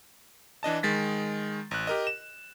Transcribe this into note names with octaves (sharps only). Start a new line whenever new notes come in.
E3 D4 D#5 A5
D#3 G#3 A6 B6
A1 F#6
G4 A#4 D#5
E7